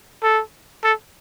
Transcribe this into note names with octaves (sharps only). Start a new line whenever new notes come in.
A4
A4